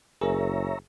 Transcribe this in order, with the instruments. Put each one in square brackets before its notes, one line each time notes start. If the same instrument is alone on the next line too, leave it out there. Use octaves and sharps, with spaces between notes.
[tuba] F#1 [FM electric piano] G#4 A#4 [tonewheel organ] C#5 E5 A#5